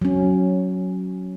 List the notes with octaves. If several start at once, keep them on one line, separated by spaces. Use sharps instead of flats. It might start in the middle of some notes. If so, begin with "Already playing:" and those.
F#3 C#4